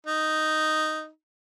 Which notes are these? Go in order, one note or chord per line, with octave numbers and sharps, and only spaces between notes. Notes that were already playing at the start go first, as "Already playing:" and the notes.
D#4